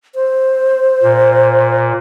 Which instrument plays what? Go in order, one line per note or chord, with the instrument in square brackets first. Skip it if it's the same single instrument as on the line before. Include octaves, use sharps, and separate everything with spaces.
[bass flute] C5
[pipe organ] A#2